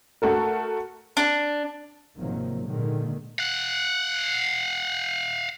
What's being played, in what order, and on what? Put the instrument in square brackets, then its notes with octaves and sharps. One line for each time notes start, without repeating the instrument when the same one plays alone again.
[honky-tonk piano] A3 F#4 A4 A#4
[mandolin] D4
[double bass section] G#1 C3 D#3 F3 F#3 A#3
A#2 D3 D#3 G#3 A#3
[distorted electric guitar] F5 F#5